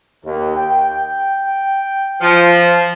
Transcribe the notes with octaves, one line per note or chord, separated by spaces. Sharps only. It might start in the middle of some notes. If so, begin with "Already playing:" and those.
D#2
G5
F3